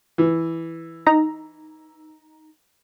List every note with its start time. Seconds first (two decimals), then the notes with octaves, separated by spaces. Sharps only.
0.18 E3
1.07 D#4 A#5